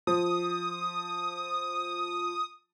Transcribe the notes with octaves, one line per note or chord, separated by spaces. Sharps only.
F3 D#6